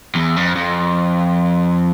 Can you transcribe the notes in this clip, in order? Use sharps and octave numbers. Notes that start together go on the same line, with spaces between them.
E2
F2
F2